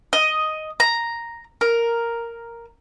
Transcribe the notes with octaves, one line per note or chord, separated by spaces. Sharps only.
D#5
A#5
A#4